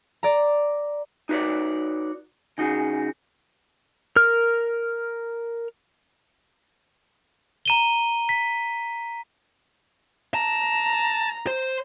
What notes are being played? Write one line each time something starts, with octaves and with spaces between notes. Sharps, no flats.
D5 A#5
D#4 F#4 B4 C#5 D5
C#3 D#4 F#4 G#4
A#4 F6
A#5 D#7 G7
B6
A5 A#5
C5